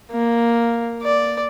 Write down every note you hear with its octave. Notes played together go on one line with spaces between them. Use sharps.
A#3
D5